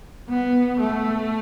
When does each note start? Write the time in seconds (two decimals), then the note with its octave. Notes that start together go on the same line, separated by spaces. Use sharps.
0.29 B3
0.80 A3